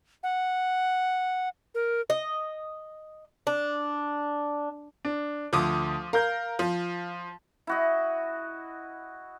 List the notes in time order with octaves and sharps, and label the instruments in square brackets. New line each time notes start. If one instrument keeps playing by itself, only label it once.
[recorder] F#5
A#4
[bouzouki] D#5
D4
[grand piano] D4
[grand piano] D2 [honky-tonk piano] F3 D6 D#6
[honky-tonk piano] A#4 [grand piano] F5 G6
[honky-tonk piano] F3
[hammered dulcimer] E4 F#4 D#5